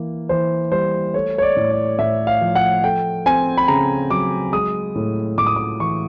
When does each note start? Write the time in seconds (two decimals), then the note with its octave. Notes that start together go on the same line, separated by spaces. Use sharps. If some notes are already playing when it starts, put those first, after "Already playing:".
Already playing: E3 A#3
0.29 E3 C5
0.72 G3 C5
1.14 A3 C#5
1.38 C#5
1.42 D5
1.57 A2
1.71 D5
1.99 A2 E5
2.27 F5
2.41 F3
2.55 F#5
2.84 A3 G5
3.26 C4 G#5
3.57 B5
3.68 C#3 A#5
4.10 F#3 D6
4.53 G#3 D#6
4.96 A2
5.38 A2 D6
5.47 D#6
5.56 D6
5.80 E3 C#6